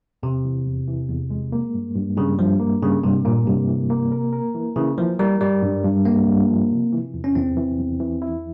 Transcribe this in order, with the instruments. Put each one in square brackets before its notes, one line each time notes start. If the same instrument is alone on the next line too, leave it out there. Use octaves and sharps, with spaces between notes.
[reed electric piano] E2 [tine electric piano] C3
[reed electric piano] E3
E2
E3
E2
G#3
A#3
G2
G2
[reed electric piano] G2 [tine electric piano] C#3
[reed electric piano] G2 [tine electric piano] F3
[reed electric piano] A#3
[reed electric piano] G2 [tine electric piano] C#3
[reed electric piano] G2 [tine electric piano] C3
[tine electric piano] A#2 [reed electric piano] A#3
[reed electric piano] G2 [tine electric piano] C3
[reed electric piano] E3
A#3
A#4
A#4
E3
[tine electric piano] C#3 [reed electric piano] E3
[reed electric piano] E3 [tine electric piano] F3
[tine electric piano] G3 [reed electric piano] A#4
[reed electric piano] G2 [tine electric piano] G3
[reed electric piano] G2
G2
[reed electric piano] G2 [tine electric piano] A#3
[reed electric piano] G2
F3
C3
E3
E2
[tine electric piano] C#4
[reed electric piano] E2 [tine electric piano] C4
[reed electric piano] E3
E2
E3
E4